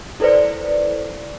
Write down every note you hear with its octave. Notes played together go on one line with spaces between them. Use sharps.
E4 A4 B4 C5 D5